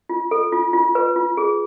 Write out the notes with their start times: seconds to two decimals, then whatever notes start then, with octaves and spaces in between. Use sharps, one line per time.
0.10 F4
0.31 A4
0.52 F4
0.73 F4
0.95 B4
1.16 F4
1.37 G#4